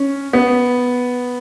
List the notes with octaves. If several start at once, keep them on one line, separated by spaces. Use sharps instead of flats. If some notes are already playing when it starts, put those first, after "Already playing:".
Already playing: C#4
B3